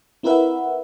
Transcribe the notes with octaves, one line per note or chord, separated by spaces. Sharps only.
C4 E4 A#4 B4 E5 F#5